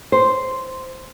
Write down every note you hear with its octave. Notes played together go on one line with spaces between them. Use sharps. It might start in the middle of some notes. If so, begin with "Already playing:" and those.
C5